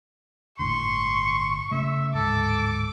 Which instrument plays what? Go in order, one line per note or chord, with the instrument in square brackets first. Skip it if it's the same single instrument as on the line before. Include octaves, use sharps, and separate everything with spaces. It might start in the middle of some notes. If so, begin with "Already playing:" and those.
[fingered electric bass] G1 A2 D3 [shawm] C6 [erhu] C#6
[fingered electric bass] C#3 A3 [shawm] E5
[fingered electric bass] D1 G#2 [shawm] A4 [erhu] D6